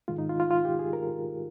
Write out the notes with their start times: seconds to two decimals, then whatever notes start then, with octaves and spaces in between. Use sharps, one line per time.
0.08 G#2 D#3 G#3 F4
0.18 D#4
0.29 F4
0.40 F4
0.51 F4
0.65 G4
0.79 G#4
0.93 A#4